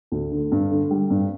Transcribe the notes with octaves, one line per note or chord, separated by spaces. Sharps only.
D2
D3
G2
D3
G3
G2